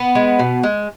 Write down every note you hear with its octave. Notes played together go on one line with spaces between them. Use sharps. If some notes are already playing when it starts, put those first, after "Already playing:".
Already playing: B3
G#3
B2
G#3